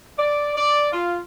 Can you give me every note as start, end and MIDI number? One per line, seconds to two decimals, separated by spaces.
0.18 0.55 74
0.55 0.87 74
0.92 1.18 65